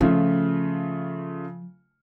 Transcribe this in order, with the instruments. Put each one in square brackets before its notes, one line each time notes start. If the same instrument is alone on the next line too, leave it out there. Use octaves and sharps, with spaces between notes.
[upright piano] C#3 A3 F4 [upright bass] F3